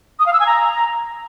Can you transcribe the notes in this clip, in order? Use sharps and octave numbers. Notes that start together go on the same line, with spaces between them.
D#6
F5
E6
G#5
A#5